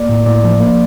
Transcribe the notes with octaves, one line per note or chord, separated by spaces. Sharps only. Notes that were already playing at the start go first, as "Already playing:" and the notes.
Already playing: A#3 D5
A2
A2 D5
F3
A#3